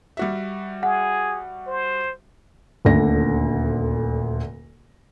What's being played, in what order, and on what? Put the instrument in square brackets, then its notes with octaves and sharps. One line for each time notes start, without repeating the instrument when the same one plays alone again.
[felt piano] G3 F#4 E5
[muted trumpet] G#4 [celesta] F#5
[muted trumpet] C5
[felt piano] D#1 D2 A#2 D3 A#6